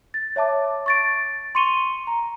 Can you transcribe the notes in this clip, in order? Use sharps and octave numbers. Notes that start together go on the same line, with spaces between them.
A6
C#5 E5 A5 D6
C#6 A6 D7
C6 C#6 C#7 D#7 F7 G7
A#5